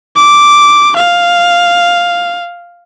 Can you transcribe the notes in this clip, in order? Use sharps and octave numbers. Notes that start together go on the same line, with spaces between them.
D6
F5